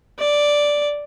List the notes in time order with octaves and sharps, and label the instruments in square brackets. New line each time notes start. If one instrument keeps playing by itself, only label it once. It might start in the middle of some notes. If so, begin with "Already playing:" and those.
[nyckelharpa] D5